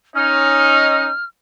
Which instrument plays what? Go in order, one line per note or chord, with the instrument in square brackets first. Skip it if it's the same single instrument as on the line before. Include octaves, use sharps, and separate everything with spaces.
[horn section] C#4 D#4 [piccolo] F6